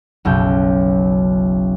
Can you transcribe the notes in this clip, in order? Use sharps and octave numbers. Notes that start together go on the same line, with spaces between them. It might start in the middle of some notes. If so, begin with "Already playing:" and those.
F#1 B1 F#3 G6